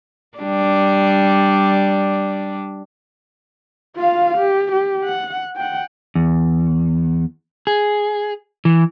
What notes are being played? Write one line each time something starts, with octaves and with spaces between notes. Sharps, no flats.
G3 D4
F4 F5
G4
G4
F#5
F#5 G5
E2
G#4
E3